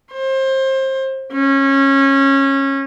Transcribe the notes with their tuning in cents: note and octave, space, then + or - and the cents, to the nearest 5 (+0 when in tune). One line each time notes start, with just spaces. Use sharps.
C5 +30
C#4 -20